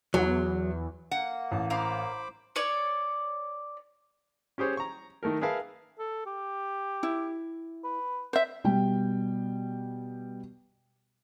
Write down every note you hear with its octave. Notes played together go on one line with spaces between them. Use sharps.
E2 F#3
A#3 F#5
A1 A5
C5 F5 A#5 B5 D6
C#5 D5
C#4 G4 G#4 C5 C#5
A#5 C#6
D#3 A3 A4 A#4
G#4 A#4 B4 E5 F5 A5
A4
G4
E4
B4
C5 E5
B2 G3 G5